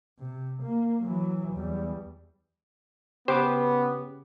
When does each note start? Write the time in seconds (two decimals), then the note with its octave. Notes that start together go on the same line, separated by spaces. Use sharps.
0.19 C3
0.63 A#3
1.03 E3 F#3
1.53 E2 G3
3.28 C#3 B3 G4 B4 C5 D6